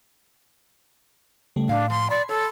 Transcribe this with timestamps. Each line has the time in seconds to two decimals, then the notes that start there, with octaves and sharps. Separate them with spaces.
1.56 C#3 G3 A3
1.69 A2 D4 F5
1.90 F3 C6
2.10 D5 B5 C6 G#6
2.29 A4 C#5